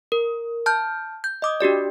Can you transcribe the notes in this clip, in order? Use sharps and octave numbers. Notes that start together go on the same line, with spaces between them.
A#4
A5 F6 G6
G6
D#5 D6 D#6
D4 F#4 G4 D5